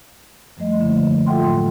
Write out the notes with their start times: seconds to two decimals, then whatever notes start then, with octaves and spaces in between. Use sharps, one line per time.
0.57 F#2 F3 G3 A3 D#5
0.79 D3 F3 A3 A#3 E4
1.26 F4 A4 E5 F#5 G5 C6
1.40 A2 F#3